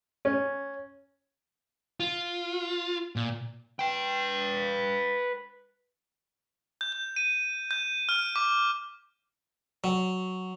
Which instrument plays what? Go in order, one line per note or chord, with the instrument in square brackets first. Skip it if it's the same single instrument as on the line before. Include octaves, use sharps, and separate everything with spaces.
[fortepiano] C#4
[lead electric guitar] F4
A#2
B4 G5
[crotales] G6
G6
D#7
G6
F6
D6
[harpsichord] F#3